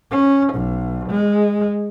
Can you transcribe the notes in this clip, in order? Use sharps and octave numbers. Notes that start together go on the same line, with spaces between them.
C#4
B1
G#3